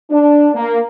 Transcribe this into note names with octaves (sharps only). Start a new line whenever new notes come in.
D4
A#3